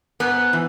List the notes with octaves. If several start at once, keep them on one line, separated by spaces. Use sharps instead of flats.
G#2 B3
E3